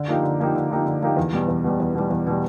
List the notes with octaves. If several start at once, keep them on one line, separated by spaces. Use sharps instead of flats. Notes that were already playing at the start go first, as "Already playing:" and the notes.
Already playing: D3
F3 A#3 D#4 G4
D3
F3 A#3 D#4 G4
D3
F3 A#3 D#4 G4
D3
F3 A#3 D#4 G4
E2
B2 G3
E2
B2 G3
E2
B2 G3
E2
B2 G3